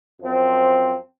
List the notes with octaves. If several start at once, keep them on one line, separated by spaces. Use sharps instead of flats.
F#2 F3 C4